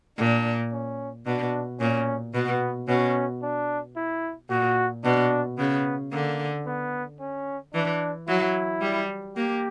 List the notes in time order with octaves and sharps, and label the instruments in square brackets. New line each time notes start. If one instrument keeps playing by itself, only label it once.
[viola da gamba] A#2 [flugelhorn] D4
[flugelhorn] C#4
[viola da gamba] B2 [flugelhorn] D4
[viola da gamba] A#2 [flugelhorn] C#4
[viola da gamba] B2 [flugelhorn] B3
[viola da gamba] B2 [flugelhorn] C#4
[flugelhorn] D4
E4
[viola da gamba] A#2 [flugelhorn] F#4
[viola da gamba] B2 [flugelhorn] D4
[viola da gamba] C#3 [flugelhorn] B3
[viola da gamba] D3 [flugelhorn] A#3
[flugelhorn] B3
C#4
[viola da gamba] E3 [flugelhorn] D4
[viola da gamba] F#3 [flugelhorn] E4
[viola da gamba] G3
[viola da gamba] A#3 [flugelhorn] G4